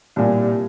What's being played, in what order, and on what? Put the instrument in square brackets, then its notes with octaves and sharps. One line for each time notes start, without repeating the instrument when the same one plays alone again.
[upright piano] C2 A#2 G3